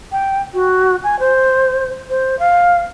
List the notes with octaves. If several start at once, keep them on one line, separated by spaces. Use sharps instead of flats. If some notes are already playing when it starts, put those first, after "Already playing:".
G5
F#4
G#5
C5
C5
F5